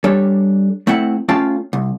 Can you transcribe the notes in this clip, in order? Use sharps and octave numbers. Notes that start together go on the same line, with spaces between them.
G3 D4 A4 C#5
A3 C4 E4 F#5
A3 C#4 F4 F5 G5 A5
C2